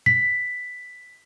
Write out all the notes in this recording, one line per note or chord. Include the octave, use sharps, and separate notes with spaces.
B6